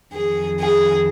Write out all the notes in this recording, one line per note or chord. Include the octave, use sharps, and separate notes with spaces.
F2 D#3 G#4
G#4